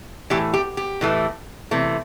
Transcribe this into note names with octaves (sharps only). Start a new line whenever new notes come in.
A2 E3 A3 G4
G4
G4
A2 E3 A3
C3 E3 A3